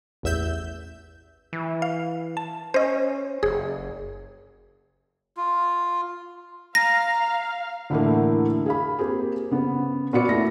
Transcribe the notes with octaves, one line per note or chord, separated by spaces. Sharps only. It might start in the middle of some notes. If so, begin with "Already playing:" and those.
A1 E2 E5 E6 G6
E3
F5
A5
C#4 C5 D#5
F#1 G#4
F4
F5 A#5 A#6
D2 A2 D3 E3 A3 A#3
G#4 F5 B5
A#3 C4 G4 G#4
C#3 B3
A#2 B3 F#4 D5 C#7
A3 E4 A#6